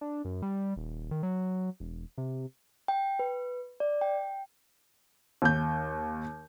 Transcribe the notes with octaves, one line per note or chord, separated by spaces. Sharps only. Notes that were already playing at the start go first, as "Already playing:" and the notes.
D4
F#2
G3
D#1
D#3
F#3
E1
C3
G5
B4
D5
G5
D#2 G6